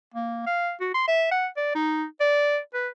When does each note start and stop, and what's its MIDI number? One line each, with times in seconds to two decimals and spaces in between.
0.14 0.42 58
0.47 0.73 77
0.80 0.89 66
0.94 1.06 84
1.07 1.28 76
1.31 1.47 78
1.57 1.71 74
1.75 2.04 63
2.20 2.59 74
2.74 2.89 71